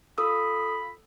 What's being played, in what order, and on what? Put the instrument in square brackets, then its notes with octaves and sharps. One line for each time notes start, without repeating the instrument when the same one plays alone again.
[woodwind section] F4 B5 [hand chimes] A4 D#6 E6